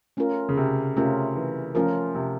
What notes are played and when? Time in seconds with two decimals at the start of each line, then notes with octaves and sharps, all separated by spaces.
0.17 A3 C#4 F4 A#4
0.49 C#3
0.57 C3
0.97 C3 A3 C#4 F4 A#4
1.36 E3
1.75 F3 A3 C#4 F4 A#4
2.15 C3